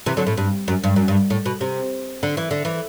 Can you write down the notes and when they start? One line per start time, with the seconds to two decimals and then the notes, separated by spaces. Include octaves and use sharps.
0.06 C3 E3
0.17 D3 F#3
0.27 A2
0.38 G2
0.68 F#2
0.84 G2
0.96 F#2
1.08 G2
1.30 A2
1.46 B2
1.61 C3
2.23 D3
2.37 E3
2.51 D3
2.65 E3